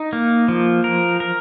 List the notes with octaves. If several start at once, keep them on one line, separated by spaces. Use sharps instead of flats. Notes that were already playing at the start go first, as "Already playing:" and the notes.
Already playing: D#4
A#3
F3
A#4
A#4